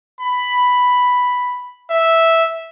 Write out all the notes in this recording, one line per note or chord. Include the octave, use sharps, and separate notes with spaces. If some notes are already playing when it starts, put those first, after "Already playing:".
B5
E5